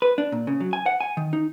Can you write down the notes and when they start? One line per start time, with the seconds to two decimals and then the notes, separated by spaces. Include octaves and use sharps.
0.02 B4
0.18 D4
0.32 A#2
0.47 C#3
0.60 F#3
0.73 G#5
0.86 F#5
1.00 G#5
1.17 D#3
1.33 D#4